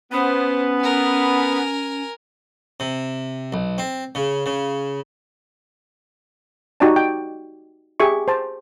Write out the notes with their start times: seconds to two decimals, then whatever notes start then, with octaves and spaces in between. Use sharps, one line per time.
0.12 B3 C#4 C5
0.80 A#4 G#5
2.80 C3
3.53 B1
3.78 C4
4.15 C#3
4.46 C#3
6.80 D#4 F#4 G4 D5 D#5 A5
6.96 G5
8.00 G4 G#4 E5 C#6
8.28 C5 A5